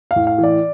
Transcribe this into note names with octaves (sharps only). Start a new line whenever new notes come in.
F5
A2
F5
E3
D5